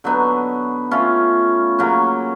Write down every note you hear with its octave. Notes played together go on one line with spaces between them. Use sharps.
D3 F#3 B3 D#4
A3 C#4 F4
C#3 F#3 A#3 C#4